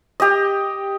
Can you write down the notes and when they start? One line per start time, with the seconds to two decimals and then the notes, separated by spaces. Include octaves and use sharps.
0.20 G4 D#5